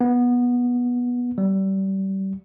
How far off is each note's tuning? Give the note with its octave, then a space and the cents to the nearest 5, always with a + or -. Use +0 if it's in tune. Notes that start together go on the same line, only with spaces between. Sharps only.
B3 -15
G3 -25